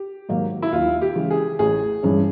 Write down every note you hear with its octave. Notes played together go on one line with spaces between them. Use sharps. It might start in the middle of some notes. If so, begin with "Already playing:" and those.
Already playing: G4
G#2 D#3 F#3 A#3
E4
D#2 F4
G4
C#3 E3 G#3
G#4
A1 G#4
G2 E3 G#3 C#4